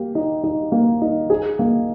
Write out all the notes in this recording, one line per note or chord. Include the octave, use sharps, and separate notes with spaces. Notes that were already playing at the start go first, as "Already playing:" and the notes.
Already playing: A#3 G4
D#4
D#4
A#3
D#4
G#4
A#3